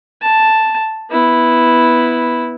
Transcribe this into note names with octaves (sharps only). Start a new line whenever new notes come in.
A5
B3 E4